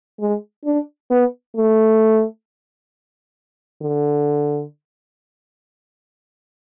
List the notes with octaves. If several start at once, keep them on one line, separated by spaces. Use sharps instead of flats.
G#3
D4
B3
A3
D3